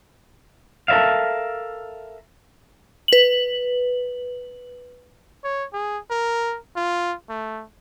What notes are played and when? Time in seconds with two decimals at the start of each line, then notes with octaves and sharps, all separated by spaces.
0.88 A4 A#4 D5 E5 F5
3.08 B4 F#7
5.44 C#5
5.73 G#4
6.10 A#4
6.76 F4
7.29 A3